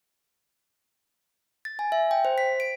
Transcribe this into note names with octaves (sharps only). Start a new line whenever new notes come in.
A6
G#5
E5
G5
C5
B6
D7